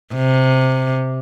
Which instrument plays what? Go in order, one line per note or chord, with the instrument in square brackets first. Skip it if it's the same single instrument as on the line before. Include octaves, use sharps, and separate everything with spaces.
[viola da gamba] C3